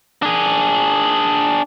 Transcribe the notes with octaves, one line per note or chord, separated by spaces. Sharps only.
D4 G#4